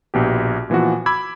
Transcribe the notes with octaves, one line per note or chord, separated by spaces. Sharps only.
A#1 B2 G4
A#2 E3 F3 B3 F#4
B5 D6 E6 G#6